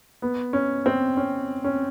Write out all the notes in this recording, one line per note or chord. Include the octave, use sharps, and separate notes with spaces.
B3
C#4
C4
C#4
C#4